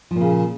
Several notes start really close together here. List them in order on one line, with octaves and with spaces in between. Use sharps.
F3 A#2 C#3